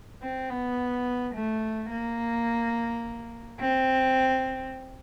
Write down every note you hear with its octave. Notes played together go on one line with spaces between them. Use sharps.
C4
B3
A3
A#3
C4